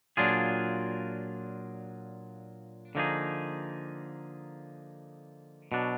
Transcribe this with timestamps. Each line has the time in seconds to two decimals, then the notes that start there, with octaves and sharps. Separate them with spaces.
0.17 A#2 F#3 D4 F4 G#4
2.95 D3 F3 A#3 D#4 G#4
5.72 B2 F#3 D4